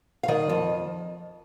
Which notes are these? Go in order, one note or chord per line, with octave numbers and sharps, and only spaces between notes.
F5
D#3 D#5
F2